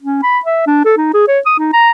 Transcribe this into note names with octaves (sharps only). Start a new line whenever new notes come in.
C#4
B5
E5
D4
A4
D#4
G#4
C#5
D#6
D#4
A#5